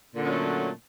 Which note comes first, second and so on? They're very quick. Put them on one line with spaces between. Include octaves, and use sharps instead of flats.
A#2 D3 C#4 F#3 A3